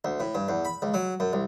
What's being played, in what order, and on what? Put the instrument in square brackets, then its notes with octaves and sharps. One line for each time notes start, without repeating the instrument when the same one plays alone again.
[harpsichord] D2
A2
G2
E2
B5
C#2
F#3
F#2
C2